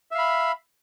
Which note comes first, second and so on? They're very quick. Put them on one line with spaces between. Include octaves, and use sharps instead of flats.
E5 F5 B5